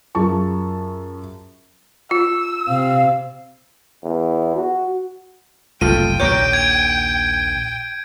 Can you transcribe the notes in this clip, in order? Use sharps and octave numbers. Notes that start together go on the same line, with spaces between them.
F#2 F4 G#4 A5 C#6
F4 E6
C3 F5
E2
F#4
F#1 C2 A3 F4 A4 G5 D#7
A#1 D#2 C#5 D5 A#5 G6 D7
G#6 D7